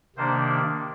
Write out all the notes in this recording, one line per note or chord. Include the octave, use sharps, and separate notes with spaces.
C3 D#3 A#3 D4 C5